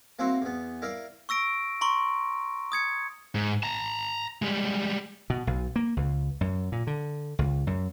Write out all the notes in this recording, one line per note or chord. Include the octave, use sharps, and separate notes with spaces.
A#3 C4 E4 F#4 C5
E2 B3
E4 A#4 D5 F5
C#6 E6 A#6 D7
A#5 C6 C#6
D#6 G#6 C#7
G#2
A5 A#5
G3 G#3
B2
B1
A#3
C#2
F#2
A#2
D3
C#2
F#2